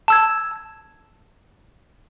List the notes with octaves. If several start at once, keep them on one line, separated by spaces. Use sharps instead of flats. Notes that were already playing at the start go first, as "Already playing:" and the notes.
A5 E6 G#6